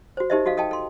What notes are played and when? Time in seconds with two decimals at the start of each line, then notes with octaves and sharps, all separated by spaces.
0.17 F#4 C5
0.30 D#4 G4 A#4 C5 D#5 E5
0.46 F#4 A4 D#5 F5
0.57 A4 D#5 G5 A5
0.71 A4 C6